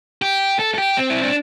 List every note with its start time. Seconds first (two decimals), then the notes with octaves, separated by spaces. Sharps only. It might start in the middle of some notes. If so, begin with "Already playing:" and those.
0.22 G4
0.59 A4
0.74 A4
0.78 G4
0.97 C4
1.10 E4
1.23 D4